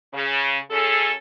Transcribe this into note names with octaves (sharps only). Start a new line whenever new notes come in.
C#3
F#2 C#4 G#4 A4